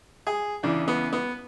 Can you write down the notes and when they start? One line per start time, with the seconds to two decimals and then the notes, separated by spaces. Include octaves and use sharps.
0.27 G#4
0.63 E2 C#3 E3 D4
0.88 B3
1.13 B3